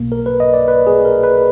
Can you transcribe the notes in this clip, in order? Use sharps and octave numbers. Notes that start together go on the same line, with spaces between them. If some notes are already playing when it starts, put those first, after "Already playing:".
Already playing: B1 B2 A#3
A#4
B4
D#5
D5
B4
G#4
A#4
B4